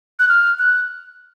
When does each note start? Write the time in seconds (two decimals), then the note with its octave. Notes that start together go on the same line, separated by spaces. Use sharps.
0.19 F#6
0.29 F6
0.59 F#6